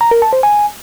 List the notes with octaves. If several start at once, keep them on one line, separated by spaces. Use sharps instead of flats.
A#5
A#4
A5
C5
G#5